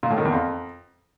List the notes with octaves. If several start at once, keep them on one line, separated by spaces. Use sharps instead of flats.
A#2
A2
D#3
E2
F2